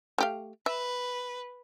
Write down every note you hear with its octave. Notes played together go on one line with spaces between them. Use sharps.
A3 G4 F5
B4 E5